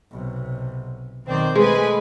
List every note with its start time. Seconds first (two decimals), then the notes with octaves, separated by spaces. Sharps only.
0.11 B1 C3
1.26 B1 D#3 C4 D5 G6
1.55 G#3 A3 G#4 B4 G#5